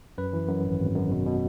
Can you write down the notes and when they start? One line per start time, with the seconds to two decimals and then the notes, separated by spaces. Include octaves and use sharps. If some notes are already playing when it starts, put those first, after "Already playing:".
0.18 F#2 B4
0.33 E3
0.48 F#2
0.64 G#1
0.80 G#1
0.95 F#2
1.11 B2
1.26 B2